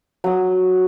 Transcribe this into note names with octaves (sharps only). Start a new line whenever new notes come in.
F#3 D#6